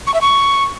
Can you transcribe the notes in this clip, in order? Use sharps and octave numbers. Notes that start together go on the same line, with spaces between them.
C#6
E5
C#6